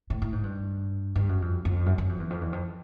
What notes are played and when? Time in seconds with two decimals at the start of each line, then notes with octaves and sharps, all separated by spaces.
0.10 A2
0.22 A2
0.32 G#2
0.43 G2
1.16 G2
1.29 F#2
1.42 F2
1.65 F2
1.86 F#2
1.98 F#2
2.09 F2
2.20 E2
2.30 F2
2.41 E2
2.53 F2